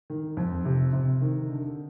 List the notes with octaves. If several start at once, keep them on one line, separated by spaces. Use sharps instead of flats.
D#3
F2
C3
C3
D#3
D3